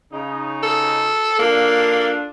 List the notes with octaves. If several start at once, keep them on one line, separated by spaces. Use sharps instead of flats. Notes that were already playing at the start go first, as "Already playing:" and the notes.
C#3 D#4
A4
A#3 D4 F4 A4